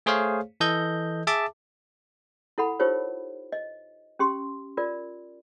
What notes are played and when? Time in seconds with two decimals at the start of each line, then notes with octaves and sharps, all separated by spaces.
0.06 A3 G#4 C5 C#5 F5
0.60 E3 A4 D#5 G6
1.27 G#4 E5 A5 D6
2.58 E4 A4 F#5 B5
2.80 D#4 F4 G4 A#4 C5 C#5
3.52 D#5
4.19 C#4 G4 C6
4.77 F4 A#4 D5